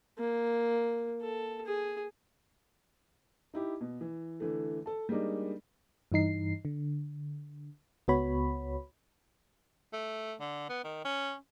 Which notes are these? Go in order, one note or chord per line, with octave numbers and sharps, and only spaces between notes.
A#3
A4
G#4
D#4 E4 G4
B2
E3
D3 E3 A3
A4 A5
G3 G#3 A#3 D4 D#4
G2 E3 D#4 C7
D3
C#2 B3 F#4 C#5 B5
A3
D3
B3
D#3
C#4